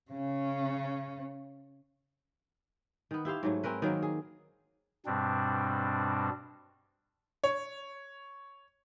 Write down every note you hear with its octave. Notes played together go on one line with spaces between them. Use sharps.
C#3 C#4
D#3 B3
E4 G4 C5 F5
G#2 F#3 A3
C4 C#4 A#4 B4
D#3 F#3 A#3 C4
G#4
G2 B2 G3 C4 D4
C#5